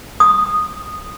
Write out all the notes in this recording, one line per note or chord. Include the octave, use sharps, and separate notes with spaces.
D#6